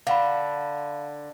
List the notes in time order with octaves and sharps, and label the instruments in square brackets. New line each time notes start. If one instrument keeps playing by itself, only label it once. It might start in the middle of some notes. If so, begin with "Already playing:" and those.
[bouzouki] D3 [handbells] F5 F#5 B5